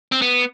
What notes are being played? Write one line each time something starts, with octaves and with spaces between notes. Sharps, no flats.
C4
B3